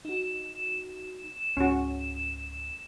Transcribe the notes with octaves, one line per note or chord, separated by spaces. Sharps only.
D#4 F#4 E7
C#2 G#2 C#4 F#4